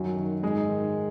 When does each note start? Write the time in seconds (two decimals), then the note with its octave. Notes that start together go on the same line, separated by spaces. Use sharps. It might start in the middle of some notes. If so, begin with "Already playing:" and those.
Already playing: F#2 D#3 F#3 F#4
0.17 D#3
0.43 G#2 G#3 G#4
0.69 D#3